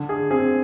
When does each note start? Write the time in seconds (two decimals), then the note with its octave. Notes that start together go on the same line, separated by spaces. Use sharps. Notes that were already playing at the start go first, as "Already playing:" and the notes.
Already playing: D3
0.09 G#4
0.31 C4 G#4